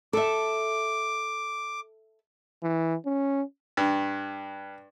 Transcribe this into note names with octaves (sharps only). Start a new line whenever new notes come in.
A4 E5 D6
E3
C#4
G2